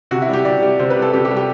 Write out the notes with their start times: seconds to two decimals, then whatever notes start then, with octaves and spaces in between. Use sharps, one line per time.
0.11 C3 F#4
0.22 E4
0.28 G3 G4
0.45 C3 D5
0.62 G3
0.79 C3 C5
0.90 B4
0.96 G3
1.02 A4
1.13 C3 G4
1.25 G4
1.31 G3
1.36 G4